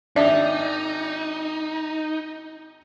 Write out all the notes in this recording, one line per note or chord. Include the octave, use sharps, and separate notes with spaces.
G#1 D4 D#4 D5 E5